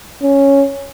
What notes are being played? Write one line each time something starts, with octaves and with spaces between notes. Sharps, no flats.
C#4